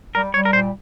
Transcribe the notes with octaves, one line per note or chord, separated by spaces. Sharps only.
G3 A#4
G3 C#5
A#4
A#2 C5